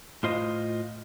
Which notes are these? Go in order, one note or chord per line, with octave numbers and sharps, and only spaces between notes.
A2 F4 C5 D#5